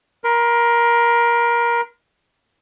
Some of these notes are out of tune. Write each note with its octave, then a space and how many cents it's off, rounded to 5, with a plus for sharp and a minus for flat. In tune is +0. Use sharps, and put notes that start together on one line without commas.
A#4 +20 C6 -35